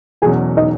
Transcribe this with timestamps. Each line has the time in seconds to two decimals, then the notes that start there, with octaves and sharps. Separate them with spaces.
0.22 E1 E2 B2 F#3 C#4 G#4 G#5
0.57 D#4 D#5